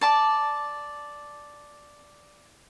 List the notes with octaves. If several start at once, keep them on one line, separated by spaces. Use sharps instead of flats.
D5 A5 D6